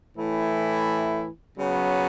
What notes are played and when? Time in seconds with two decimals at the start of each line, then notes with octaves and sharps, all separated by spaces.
0.15 A2 E3 A3 E4
1.55 C#3 F#3 B3